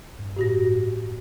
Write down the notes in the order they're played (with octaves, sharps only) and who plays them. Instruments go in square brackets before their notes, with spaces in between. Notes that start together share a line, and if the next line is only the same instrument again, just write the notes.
[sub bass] G2
[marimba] A2 F#4 A#6